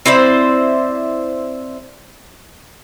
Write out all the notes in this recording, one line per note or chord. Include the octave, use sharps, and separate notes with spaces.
C4 E4 C5 D5